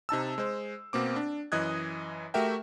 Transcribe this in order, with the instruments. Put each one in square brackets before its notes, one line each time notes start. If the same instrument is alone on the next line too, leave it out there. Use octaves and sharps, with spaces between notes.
[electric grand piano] C3 D#4 A5 E6
G#3 C5
B2 A#3 C4 D6
D4
F#2 E3 D#5 D#6 F#6 G#6
A3 F#4 G4 A#4 E5 G5